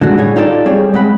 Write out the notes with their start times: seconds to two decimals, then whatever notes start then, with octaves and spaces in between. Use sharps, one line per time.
0.01 D3 G#3 F#4
0.18 A2 G3 G#4 C#5
0.36 D#4 F4 G4 A4 C5 D5
0.66 G3 C4 G#4 C#5
0.94 G#3 C4 F#5 B5